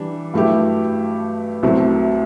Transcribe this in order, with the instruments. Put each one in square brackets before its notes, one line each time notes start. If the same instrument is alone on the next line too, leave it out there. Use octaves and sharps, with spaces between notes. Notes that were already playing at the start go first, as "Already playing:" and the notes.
Already playing: [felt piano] E3 G3 D4
G2 F#3 A3 E4 G4
C2 C3 F#3 A3